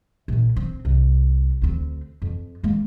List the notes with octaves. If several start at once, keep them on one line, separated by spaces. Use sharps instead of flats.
A#1 A#2
C4
C2
D2 C4
F2
G#3 A#3